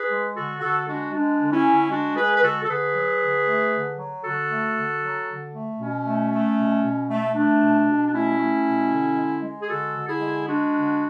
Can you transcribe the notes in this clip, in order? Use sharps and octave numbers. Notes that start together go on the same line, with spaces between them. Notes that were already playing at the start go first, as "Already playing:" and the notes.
Already playing: G#4 B4
G#3
D3 F#4 A4
D3 F#4 A4
G#3 D4 F#4
G#3 D4
D3
C#4 E4
D3
G#3 D4 F#4
G#3 G#4 B4
B4
D3 F#4 A4
A4
D3 G#4 B4
F#3
D3
A3
D3
F#3
D3 F#4 A4
A3
D3
F#3
D3
A3
B2 C#4
A3
A3
B2
B2
A3
A3 D4
B2
B2
D4
A3 C#4 E4
A3
B2
D3
G#3
G#3
G#4
D3 F#4 A4
D3
E4 G#4
G#3
G#3 D4 F#4
D3